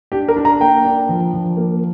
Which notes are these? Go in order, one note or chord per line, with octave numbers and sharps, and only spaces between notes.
D4 G4
A#4
D4
A#5
A#3 G5
D4
F3
F3
A#3